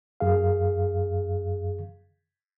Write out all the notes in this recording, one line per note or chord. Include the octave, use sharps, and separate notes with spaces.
F#2 G#4 F5